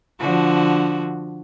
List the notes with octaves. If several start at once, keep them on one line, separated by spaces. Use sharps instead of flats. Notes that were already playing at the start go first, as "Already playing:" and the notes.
D3 F3 F#4